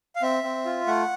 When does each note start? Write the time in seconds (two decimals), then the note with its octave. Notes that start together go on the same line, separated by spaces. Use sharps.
0.16 F5
0.22 C4 E5
0.44 C4
0.65 F4
0.87 A3 F#5